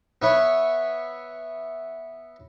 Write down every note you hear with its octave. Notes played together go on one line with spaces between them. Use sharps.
B3 E4 C#5